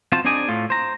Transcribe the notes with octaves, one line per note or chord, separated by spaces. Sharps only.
C4 F4 F#4 C5 A5
C4 D4 D#4 G#4 D5 G#5
A2 A3 F4
C5 A#5